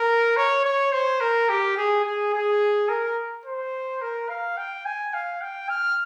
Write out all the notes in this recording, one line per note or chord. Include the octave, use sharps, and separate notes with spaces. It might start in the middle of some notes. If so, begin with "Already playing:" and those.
Already playing: A#4
C#5
C#5
C5
A#4
G4
G#4
G#4
G#4
A#4
C5
A#4
F5
G5
G#5
F5
G5
F6